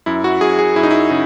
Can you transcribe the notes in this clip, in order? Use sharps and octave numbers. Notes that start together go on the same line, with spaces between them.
F#2 E4
F#4
F#2 G#4
G#4
F#2 E4
D#4
E4
C#3